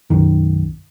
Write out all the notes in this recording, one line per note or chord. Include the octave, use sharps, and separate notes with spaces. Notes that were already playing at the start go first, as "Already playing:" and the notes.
B1 F#2 D#3